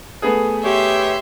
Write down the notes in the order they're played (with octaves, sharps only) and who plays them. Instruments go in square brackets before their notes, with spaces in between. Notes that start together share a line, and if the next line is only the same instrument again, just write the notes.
[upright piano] A3 B3 G#4
[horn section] G4 C#5 [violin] E5 C6